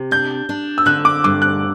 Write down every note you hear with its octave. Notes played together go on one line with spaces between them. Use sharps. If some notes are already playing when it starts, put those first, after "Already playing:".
Already playing: C3
D4 G6
D4
E6
D3 F#6
D6
G2 D6
F#6